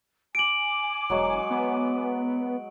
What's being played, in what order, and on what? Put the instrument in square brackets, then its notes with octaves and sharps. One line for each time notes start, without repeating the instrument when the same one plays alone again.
[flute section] G#5 D6 [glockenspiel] D7 F#7
[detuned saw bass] E1 [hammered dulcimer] F#3 G#3 C#5
[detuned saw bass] B3